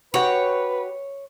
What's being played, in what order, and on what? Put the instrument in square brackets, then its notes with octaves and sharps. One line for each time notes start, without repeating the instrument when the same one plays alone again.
[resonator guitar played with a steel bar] F#4 G4 F#5 [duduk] B4 [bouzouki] C#5